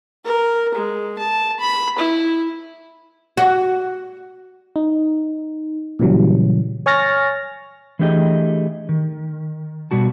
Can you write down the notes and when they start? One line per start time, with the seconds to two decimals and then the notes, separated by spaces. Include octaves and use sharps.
0.25 A#4
0.74 G#3
1.19 A5
1.60 B5
1.99 E4
3.37 F#4
4.76 D#4
5.99 A#2 C#3 E3 F#3 G3
6.86 C#5 G#5 C#6 F6 A6 A#6
7.99 E3 A3 D4 G4 G#4 D#5
8.89 D#3
9.91 B2 G3 F#4 A5